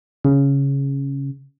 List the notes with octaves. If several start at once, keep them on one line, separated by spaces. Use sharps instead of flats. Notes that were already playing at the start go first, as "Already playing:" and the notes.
C#3